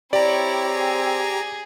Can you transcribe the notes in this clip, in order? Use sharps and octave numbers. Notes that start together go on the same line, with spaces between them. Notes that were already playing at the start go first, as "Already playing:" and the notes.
C4 E4 G4 C#5 D5 A#5
G#4